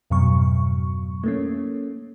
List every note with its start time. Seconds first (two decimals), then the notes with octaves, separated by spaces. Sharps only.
0.10 F2 G#2 B2 F#3 C#6
1.24 A3 A#3 C#4